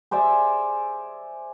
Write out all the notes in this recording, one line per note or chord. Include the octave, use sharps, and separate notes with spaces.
G#4 C5 D5 E5